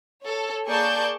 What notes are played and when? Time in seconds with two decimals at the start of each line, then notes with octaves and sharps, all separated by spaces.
0.22 A4 C#5
0.67 A#3 G#4 D5 A5 C#6 G6